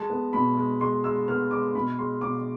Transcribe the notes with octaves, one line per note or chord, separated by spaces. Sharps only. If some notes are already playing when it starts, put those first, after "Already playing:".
Already playing: G#3 A5
B3
B2 B5
G#3
G#3 C6
G#3 E6
B3 F6
G#3 D6
B2 B5
G#3 C6
B2 D6